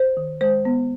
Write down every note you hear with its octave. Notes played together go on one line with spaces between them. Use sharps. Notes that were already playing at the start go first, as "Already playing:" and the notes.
Already playing: C5
D#3
G#3 C5
B3